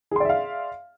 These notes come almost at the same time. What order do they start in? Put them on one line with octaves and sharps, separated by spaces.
G#4 C6 D5 E5 F5